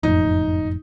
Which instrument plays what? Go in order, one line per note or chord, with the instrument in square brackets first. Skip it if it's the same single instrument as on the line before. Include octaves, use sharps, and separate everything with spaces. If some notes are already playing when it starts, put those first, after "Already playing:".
[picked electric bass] F#1 F2 A2 [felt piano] D#4